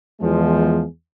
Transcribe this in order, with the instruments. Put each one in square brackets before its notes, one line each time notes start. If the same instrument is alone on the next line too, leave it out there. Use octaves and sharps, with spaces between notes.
[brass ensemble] E2 F3 G#3 G#4